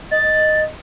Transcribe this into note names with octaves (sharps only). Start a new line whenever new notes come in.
D#5 A6